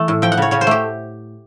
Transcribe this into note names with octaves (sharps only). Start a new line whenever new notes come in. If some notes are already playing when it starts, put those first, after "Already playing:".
Already playing: E3 A3
A2
F3 G5
F#5
C#3 C#5
C#3 C#5
C5
A3 G4